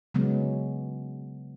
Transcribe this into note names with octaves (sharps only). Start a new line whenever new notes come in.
C#3 F#3 G#3 B3